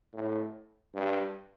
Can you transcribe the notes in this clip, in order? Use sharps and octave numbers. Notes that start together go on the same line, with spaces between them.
A2
G2